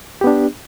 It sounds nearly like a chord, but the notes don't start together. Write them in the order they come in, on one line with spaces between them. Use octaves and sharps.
G4 B3 D4